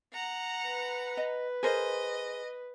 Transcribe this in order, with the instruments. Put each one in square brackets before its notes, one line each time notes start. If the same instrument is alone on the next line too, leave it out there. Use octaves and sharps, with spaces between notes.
[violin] F#5 A#5
[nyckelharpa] B4
[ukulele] D#5
[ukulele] G#4 A#4 C5 [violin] D#5